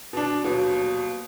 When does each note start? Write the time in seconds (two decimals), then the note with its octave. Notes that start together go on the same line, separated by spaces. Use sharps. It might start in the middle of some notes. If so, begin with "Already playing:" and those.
0.13 B2 D4
0.44 D#1 B2 F#3